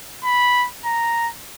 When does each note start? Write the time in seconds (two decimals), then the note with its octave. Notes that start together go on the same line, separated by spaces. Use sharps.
0.24 B5
0.85 A#5